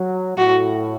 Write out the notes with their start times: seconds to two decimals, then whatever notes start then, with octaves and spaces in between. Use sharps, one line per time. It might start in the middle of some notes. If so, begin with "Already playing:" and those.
Already playing: F#3
0.38 A2 F#4